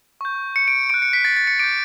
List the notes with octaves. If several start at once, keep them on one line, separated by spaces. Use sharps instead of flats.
C#6 G6
C#7
D7
C#6 F#6 D7
C#7
B6
A6
A6
C#7
D6 G6 D7